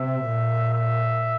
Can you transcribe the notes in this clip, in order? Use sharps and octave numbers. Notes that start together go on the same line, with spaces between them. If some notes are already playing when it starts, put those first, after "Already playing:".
Already playing: C3 E5
A#2
E5